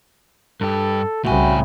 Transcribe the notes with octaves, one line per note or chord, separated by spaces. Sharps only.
G2 G4 A4
C2 A2 C#3 F#4 E5 G5 G#5 B5